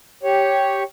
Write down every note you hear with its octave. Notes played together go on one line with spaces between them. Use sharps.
G4 C#5